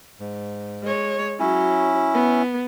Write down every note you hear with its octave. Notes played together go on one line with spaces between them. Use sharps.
G#2
G#3 C#5
F#3 C#4 E4
B3